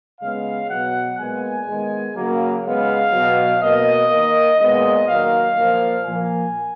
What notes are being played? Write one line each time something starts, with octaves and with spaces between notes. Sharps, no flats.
C#3 G#3 B3 F5
B2 F#3 B3 F#5
A#2 G#3 B3 G#5
D#3 G#3 B3
C#3 F#3 A#3
C#3 G#3 B3 F5
B2 F#3 B3
B2 A#3 D#5
D#3 A#3
A#2 G#3 B3 D#5
D#3 F#3 A#3 F5
A#2 F3 A#3
A#2 F3 A#3 G#5